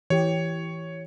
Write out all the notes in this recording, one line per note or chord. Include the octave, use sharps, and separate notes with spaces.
E3 G4 C#5